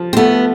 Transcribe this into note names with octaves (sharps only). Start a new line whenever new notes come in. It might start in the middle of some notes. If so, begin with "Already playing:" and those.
Already playing: F3
C4
A3 B3